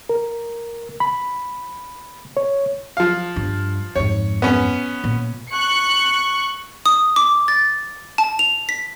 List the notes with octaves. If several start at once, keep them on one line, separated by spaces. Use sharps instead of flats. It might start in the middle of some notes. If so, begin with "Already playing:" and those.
A#4
B5
C#5
F3 F5
G2
F2 G#2 C#5
B3 C#4
A#2
C#6 F#6 C#7
D#6
D6
A6
A5
F7
B6